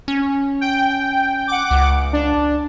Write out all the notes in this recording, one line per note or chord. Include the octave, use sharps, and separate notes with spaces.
C#4
G5
F#5 D6
C#2
D4